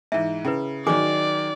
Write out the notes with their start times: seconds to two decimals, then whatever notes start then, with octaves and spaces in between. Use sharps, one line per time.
0.12 G#2 E3 E5
0.45 C#3 C#4 E4 B4
0.87 D#3 F#3 G#4 D5 G#5 D6